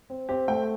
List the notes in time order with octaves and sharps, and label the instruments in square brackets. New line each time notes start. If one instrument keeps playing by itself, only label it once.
[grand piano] C4
[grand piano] C4 [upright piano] G4
[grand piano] A3 [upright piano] G5